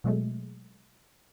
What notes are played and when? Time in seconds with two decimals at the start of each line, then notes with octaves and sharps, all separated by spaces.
0.04 B2 F#3 G#3 A3